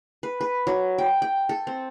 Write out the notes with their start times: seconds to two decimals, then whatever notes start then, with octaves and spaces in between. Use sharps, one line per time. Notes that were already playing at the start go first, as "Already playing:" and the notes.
0.23 B4
0.41 B4
0.67 F#3
0.98 G5
1.22 G5
1.49 A4
1.67 C4